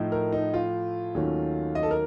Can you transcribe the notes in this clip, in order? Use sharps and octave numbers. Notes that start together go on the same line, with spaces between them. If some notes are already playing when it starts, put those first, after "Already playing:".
Already playing: A2 F3 A3 D#4
A#4
D#4
F4
D#2 D#3 F#3 A3 C#4
D#5
A4
A#4